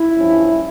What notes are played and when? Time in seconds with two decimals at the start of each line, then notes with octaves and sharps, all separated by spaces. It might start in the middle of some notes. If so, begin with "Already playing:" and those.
Already playing: E4
0.16 G2 F3 C#4